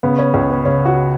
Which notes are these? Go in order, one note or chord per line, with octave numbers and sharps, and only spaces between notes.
C#3 B3
C#4
C#2 C#4
B3
C#3 C#4
F#4